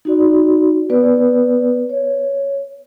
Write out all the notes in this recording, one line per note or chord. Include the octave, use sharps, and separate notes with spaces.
D#4 F#4 D5
B3 B4 D5
C#5